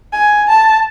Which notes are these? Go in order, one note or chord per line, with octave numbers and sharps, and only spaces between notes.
G#5
A5